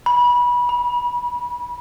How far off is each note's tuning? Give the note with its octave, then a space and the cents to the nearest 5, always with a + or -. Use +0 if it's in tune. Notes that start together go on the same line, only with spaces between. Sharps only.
B5 -25
B5 -45